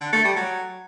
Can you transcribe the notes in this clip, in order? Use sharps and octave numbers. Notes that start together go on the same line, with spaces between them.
D3
A3
G3
F#3